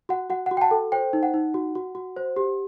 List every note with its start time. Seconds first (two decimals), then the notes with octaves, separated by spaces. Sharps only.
0.09 F#4 F#5
0.30 F#4 F#5
0.46 F#4 F#5
0.57 G5
0.61 F#5 A5
0.71 A4
0.92 C5 G5
1.13 D#4
1.23 F#5
1.34 D#4
1.54 F#4
1.75 F#4
1.95 F#4
2.17 C5
2.36 G4